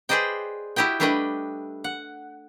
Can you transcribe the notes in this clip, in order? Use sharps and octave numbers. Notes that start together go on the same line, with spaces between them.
G#4 B4 C5 D5 D#5 G5
E4 F#4 G4 D#5 G5
G3 A3 D4 B4 D#5 G5
F#5